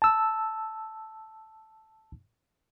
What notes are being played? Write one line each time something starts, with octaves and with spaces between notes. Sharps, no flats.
A5 E6